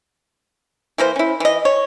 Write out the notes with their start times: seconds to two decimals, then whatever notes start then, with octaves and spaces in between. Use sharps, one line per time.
0.98 E3 A#3 C5
1.16 C#4 E4
1.40 E3 D#5
1.65 C#5